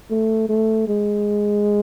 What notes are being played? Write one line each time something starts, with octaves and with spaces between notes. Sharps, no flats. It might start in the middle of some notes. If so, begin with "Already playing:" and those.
A3
A3
G#3